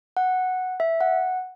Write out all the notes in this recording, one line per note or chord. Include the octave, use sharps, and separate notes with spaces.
F#5
E5
F#5